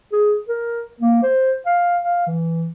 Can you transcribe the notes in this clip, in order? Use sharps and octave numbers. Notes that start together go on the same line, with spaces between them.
G#4
A#4
A#3
C5
F5
F5
E3